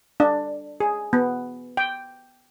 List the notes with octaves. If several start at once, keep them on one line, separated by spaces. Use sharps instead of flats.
D4
G#4
B3
G5